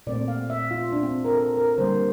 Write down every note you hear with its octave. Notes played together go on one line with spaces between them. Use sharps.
A#2 A3 C4 D5
F5
E5
F4
D4
C4
A#4
A4
A#4
D3 G3 A#3 C5